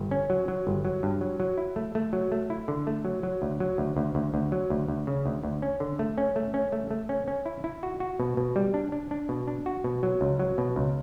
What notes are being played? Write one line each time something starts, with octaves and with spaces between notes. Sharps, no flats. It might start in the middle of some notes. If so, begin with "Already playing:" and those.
Already playing: G1
C#4
F#3
F#3
G1
F#3
G2
F#3
F#3
E4
A3
A3
F#3
A3
E4
D3
A3
F#3
F#3
D2
F#3
D2
D2
D2
D2
F#3
D2
D2
C#3
D2
D2
C#4
D3
A3
C#4
A3
C#4
A3
A3
C#4
C#4
E4
E4
F#4
F#4
B2
B2
G3
D4
D4
D4
B2
D4
F#4
B2
F#3
C#2
F#3
B2
C#2